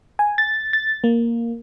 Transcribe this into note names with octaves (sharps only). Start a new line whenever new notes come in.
G#5
A6
A6
A#3